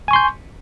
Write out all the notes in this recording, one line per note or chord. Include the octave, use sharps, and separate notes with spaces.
G#5 C6 C#6 G6